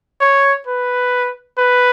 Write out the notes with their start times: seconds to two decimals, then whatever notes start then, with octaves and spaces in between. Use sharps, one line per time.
0.21 C#5
0.67 B4
1.58 B4